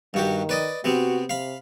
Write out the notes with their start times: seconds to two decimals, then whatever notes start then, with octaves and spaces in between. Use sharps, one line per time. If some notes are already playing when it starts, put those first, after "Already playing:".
0.14 G2 D#3 F#4 G4
0.49 B4 D5 D#5
0.84 C3 B3 C4 F#4
1.30 C3 F5 B5